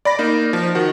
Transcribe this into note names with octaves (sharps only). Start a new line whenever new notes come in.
D5 B5 A#6
A#3 D#4
F3
D#3 F#4